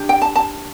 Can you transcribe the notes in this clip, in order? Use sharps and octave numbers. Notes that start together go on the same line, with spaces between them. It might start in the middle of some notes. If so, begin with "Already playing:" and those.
Already playing: D4 G4
G5
A5
A5